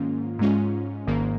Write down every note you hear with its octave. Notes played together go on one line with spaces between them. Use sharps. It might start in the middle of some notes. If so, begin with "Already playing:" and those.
Already playing: G#2 D#3 A#3 C#4 F4
G#2 G#3 C#4 F4
G#1 G#2 D#3 A#3